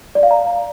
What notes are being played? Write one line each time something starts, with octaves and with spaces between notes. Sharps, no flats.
D5
F5
A#5